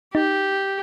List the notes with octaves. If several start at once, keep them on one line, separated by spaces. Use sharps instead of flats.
D#4 G4